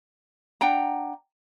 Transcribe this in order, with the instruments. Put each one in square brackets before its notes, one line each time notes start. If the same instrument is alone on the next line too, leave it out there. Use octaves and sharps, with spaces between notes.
[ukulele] D4 F#5 G5 A#5